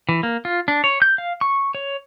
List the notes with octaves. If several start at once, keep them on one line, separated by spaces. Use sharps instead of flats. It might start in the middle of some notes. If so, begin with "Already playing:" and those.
E3
A#3
F4
D4
C#5
G6
F5
C#6
C#5